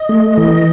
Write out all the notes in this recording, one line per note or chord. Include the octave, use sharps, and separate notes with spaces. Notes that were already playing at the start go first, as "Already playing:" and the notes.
Already playing: D#5
A3
E3